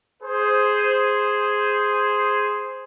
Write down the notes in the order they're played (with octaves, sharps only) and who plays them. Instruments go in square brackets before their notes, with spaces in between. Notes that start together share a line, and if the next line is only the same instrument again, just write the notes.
[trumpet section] G#4 C5